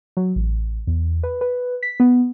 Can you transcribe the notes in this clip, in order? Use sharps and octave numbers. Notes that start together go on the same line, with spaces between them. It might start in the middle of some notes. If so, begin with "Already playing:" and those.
F#3
A1
E2
B4
B4
B6
B3